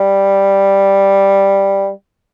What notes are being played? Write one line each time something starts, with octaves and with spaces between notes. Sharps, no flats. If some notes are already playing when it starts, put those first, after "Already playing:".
Already playing: G3